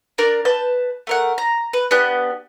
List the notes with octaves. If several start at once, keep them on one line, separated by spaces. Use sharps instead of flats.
D4 A#4 D5
B4 A5 G6
A3 A#4 F#5
A#5
B4
B3 D4 G4 F#6